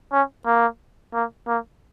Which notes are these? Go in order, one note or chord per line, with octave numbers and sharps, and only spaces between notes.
C#4
A#3
A#3
A#3